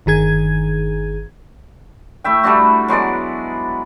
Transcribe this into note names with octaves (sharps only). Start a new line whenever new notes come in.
G1 D#3 G#4 G#6
A3 E4 E5 G5
G3 A3 D4 F#4
F#3 G#3 B3 D5